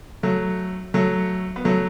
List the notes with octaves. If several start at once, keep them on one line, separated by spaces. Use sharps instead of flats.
F#3 A3
F#3 A3
B3
F#3 A3